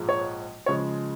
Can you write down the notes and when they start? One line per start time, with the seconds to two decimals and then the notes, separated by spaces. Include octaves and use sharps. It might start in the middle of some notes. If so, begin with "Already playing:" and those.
Already playing: A#1 G#2 F3 G#3
0.09 C#5
0.66 C#3 F3 G#3 C#5